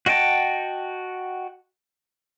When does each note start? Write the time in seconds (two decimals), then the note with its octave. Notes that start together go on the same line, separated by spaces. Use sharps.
0.06 F#4 D#5 F#5 G5 A5